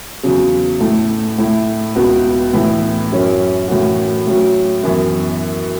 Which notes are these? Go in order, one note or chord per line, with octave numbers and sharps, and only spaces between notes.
E2 C#3 F#3
A2 A3 E4
A2 A3 E4
C#2 B2 B3 F#4
A2 E3 B3 E4
F#2 F#3 C#4
A2 E3 C#4 F#4
A2 F#3 C#4
F#2 E3 B3